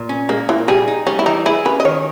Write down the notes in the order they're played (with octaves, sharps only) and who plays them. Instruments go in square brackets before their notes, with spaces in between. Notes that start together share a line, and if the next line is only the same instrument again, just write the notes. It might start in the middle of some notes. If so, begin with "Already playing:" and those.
Already playing: [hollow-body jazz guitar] A#2
C#4
[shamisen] G#3 [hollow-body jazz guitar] A#3
[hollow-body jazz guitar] A#2 [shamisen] E3
[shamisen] G3 [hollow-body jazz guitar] G#4
[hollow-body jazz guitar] D#4
[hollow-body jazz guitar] G3 [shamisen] C#4
[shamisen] E4
[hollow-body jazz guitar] E3 [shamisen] D#4
[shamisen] E4 [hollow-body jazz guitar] G#4
[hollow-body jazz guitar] C#4 [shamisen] B4
[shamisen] D#5
[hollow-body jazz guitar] D#3 [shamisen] C#5